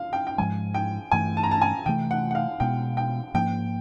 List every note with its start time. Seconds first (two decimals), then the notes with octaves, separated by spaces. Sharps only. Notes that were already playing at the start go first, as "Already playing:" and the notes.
Already playing: F5
0.13 G5
0.27 G5
0.38 G#2 F3 G#3 G#5
0.74 G5
1.11 G2 E3 A3 G#5
1.37 A5
1.43 A#5
1.51 A5
1.62 G#5
1.86 C3 E3 A3 G5
2.11 F#5
2.31 F#5
2.35 F5
2.60 B2 G#3 B3 G5
2.97 G5
3.34 G#2 F3 A#3 G5